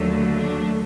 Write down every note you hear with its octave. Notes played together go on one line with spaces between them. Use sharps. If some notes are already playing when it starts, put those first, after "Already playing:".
Already playing: D#2 D3 F#3 A3
D4